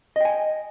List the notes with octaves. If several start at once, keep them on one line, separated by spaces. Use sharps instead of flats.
D#5 G5 G#5